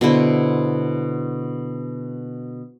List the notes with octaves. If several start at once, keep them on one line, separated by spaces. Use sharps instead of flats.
B2 D3 E4 C5